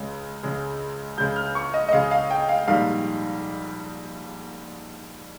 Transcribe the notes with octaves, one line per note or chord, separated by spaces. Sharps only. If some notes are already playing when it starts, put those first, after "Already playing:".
Already playing: C#2 C#3 G#3
C#2 C#3 G#3
C#2 C#3 G#3 G6
F6
C#6
D#5
D#5
C#2 C#3 G#3 F5
F5
G5
F5
A#1 G#2 D#3 G3 A#3 F5